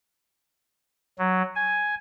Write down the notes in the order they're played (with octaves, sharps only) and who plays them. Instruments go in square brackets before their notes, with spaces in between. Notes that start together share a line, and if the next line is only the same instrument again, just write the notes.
[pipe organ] F#3
G#5